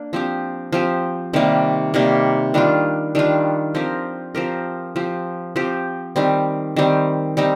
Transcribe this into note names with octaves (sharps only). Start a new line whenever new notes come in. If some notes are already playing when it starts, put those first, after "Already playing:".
Already playing: A#3 D4
F3 C4 G4
F3 C4 G4
C3 D#3 G3 A#3
C3 D#3 G3 A#3
D#3 G3 D4 F4
D#3 G3 D4 F4
F3 C4 G4 A#4
F3 C4 G4 A#4
F3 C4 G4
F3 C4 G4
D#3 G3 C4
D#3 G3 C4
G3 C4 D#4